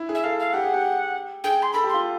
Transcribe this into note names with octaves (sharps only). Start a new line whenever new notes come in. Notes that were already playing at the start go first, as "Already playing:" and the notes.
Already playing: E4
G#4
E5
A4 F5
F5
G4 F#5
G#4
G4
G#4 G5
C6
A4 B5
G4
F4 C6